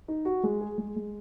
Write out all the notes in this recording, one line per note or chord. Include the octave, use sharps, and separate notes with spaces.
D#4
F#4
G#3
G#4
G#3
G#3